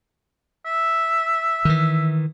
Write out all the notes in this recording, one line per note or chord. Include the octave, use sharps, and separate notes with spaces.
E5
D#3 E3